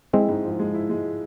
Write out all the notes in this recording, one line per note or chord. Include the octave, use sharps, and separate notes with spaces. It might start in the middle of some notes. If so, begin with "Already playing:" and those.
G#3 C4 E4
G#2
F3
G#3
E4
G#3